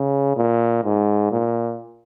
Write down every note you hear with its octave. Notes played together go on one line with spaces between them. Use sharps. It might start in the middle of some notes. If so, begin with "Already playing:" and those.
Already playing: C#3
A#2
G#2
A#2